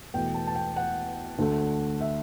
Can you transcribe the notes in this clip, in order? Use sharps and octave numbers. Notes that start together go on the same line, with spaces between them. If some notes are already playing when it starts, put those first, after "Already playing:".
E2 B2 A3 G5
A5
A5
G5
F#5
D2 D3 A3
E5